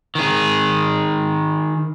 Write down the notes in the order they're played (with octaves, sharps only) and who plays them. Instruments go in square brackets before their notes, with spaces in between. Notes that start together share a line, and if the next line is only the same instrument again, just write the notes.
[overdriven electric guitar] D#3 G#4